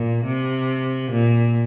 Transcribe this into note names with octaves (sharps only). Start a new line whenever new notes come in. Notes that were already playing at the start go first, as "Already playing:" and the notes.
Already playing: A#2
C3
A#2